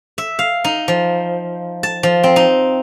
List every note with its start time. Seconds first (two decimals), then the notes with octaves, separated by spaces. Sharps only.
0.18 E5
0.39 F5
0.64 D#4
0.88 F3
1.83 A5
2.03 F3
2.23 C4
2.36 D#4